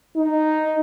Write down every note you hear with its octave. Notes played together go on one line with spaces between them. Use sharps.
D#4